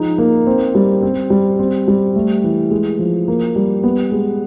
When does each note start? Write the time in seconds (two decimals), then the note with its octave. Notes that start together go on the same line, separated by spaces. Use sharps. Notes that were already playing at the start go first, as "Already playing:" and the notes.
Already playing: F3 G#3 D#4
0.18 A#3
0.47 C4
0.75 G3
1.03 C4
1.30 G3
1.59 C4
1.88 G3
2.16 A3
2.44 E3
2.71 G#3
2.99 F3
3.28 A#3
3.56 G3
3.83 B3
4.12 G#3